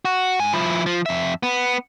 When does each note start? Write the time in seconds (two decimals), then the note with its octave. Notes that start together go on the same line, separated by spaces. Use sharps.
0.05 F#4
0.39 G#2 G#5
0.53 F3 E4
0.86 F3
1.06 F2 E5
1.43 B3